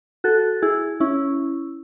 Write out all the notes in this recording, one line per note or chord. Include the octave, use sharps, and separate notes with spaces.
F#4 A4
E4 G#4
C#4 E4